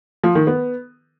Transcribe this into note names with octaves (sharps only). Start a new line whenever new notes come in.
F3
D#3
B3